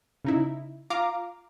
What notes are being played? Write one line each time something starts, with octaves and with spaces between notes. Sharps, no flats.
C#3 D#4 E4
F4 F5 A#5 D6